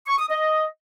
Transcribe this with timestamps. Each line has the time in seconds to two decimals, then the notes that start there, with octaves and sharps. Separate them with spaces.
0.07 C#6
0.18 D#6
0.30 D#5